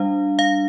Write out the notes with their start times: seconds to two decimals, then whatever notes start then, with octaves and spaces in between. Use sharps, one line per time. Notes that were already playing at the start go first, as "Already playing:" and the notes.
Already playing: G3 D4 F5
0.39 F5